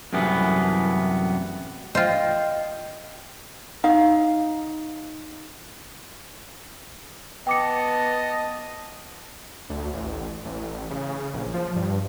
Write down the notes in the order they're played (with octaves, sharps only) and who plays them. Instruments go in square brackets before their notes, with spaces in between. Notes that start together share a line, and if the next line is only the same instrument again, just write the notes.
[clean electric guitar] C2 F#2 A2 E3 B3
[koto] F4 C5 [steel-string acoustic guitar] D#5 G5
[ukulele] D#4 F5
[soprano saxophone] B3 [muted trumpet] D#5 [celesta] G5 D6 C#7 [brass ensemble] A5
[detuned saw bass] D2
A1
A1
C#3
A#1
F3
G2